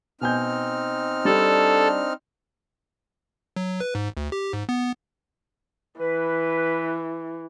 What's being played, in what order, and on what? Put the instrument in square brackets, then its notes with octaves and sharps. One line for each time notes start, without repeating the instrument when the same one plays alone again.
[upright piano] B2 G#5 G6 [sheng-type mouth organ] C4 D#4 F6
[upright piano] G3 [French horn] D4 [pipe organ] A4
[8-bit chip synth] F#3
B4
G#2
D2
G4
G#2
B3
[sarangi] E3 [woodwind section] B4